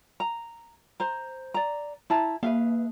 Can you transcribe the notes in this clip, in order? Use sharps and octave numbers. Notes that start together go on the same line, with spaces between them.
A#5
C5 A#5
D5 A#5
E4 A5 A#5
A#3 B4 E5 F5